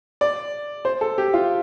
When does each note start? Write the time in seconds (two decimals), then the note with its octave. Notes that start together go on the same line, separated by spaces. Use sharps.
0.21 D5
0.85 C5
1.01 A4
1.18 G4
1.34 F4